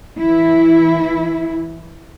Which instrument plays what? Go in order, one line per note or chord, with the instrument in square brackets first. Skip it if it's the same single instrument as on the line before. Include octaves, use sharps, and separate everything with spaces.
[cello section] E3 E4